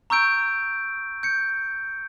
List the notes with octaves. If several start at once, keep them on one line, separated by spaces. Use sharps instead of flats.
A#5 C#6 E6 G6 D7
G6 C#7